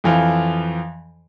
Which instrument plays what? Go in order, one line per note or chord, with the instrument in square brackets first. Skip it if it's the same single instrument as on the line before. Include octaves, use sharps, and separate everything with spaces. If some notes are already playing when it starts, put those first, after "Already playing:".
[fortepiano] F2 E3 F3